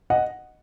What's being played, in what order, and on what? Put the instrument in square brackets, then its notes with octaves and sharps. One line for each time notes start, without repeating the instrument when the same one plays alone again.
[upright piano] D#5 F#5